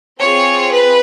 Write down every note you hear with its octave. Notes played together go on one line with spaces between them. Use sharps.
C4 F4 G#4 C#5
B4